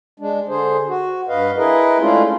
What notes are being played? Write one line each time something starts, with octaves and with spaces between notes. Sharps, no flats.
G#3 D4
D3 G#4 C5
F#4
G2 B4 D#5 F5
E4 G#4 A#4 B4 D#5
G#3 A3 C#4 D4 E4 F4